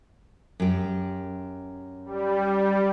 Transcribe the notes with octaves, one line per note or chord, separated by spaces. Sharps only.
F#2 G4
G3